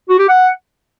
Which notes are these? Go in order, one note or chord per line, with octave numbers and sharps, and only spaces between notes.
F#4
G4
F#5